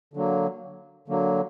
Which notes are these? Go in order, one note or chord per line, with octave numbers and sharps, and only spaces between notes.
D3 F#3 A#3
D3 F#3 A#3